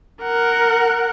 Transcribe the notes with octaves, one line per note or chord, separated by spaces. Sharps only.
A#4 F#5